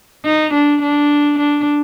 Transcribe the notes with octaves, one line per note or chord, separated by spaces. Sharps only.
D#4
D4
D4
D4